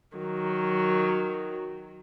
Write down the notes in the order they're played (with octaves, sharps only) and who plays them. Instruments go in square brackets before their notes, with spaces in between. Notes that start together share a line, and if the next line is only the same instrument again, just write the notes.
[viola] D#3 F#3